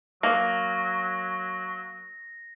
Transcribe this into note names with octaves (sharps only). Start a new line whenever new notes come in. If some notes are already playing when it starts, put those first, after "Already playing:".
F#3 A#3 A#6